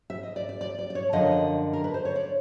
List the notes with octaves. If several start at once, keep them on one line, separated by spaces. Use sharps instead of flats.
E5
D#5
D5
D5
D5
D5
D5
C#5
F#2 D3 F3 D#5
A#4
B4
C5
C#5
D5